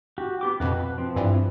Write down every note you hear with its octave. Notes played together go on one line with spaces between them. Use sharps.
F#4 G4
B3 G4 D6
F2 B2 B4
F3 C4
G2 E3